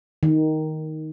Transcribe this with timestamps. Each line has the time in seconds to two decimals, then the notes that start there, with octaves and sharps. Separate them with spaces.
0.23 D#3